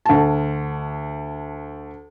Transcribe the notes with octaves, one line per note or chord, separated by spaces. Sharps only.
D2 A5